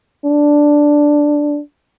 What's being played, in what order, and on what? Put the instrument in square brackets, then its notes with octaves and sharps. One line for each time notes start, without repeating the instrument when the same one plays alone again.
[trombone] D4